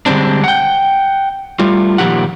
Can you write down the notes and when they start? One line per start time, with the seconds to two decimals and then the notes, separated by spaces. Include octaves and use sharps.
0.06 D3 G3 G#3 C4 D4
0.44 F#5 G5
1.59 G3 A3 F4
1.98 A#2 D#3 F3 F4 G4 F#5